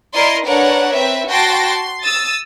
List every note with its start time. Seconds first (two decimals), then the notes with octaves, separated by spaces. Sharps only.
0.13 E4 A#4 D5 D#5 C6
0.45 D4 A#4 B4 C#5 F#5
0.93 C4 B4 E5
1.29 F#4 G5 A5 C6 A#6 D7
1.66 C6
2.03 D#6 E6 A6